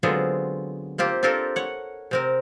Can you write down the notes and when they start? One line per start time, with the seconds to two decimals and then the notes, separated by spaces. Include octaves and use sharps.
0.03 D3 F#3 G#3 B3 C4 F4
0.98 A#3 C4 F4 G4
1.23 C4 D4 F4 G4 A4 A#4
1.56 C#5 F#5
2.11 C3 C4 A#4